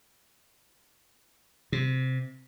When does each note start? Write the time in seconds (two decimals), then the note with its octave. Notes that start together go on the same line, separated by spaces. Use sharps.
1.72 C3